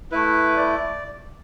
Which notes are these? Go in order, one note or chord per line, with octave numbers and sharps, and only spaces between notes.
A3 E4 B4
D5